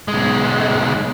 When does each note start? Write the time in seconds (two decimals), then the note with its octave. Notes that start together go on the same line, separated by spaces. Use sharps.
0.08 B1 G#3